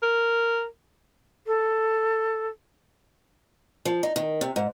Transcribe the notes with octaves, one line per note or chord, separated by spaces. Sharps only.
A#4
A4
F3
D#4
D#3
C3
G#2